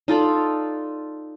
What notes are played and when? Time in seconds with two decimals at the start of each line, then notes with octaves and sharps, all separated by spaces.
0.08 D#4 F4 A4 D5